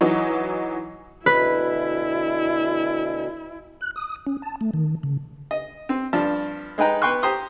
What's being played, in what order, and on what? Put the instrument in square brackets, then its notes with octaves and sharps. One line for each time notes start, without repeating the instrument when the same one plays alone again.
[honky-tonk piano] E3 F#3 D#4
[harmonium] D2 B2 [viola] E4 [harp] B4
[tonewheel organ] F#6
D#6
C#4
A5
A3
D#3
C#3
[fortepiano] D#5
C4
G2 F3 D5 A5 F6
G#3 D#4 B4 G5 A#5
B3 B4 G5 C6 C#6 F#6
G4 C5 A#5 C6 D#6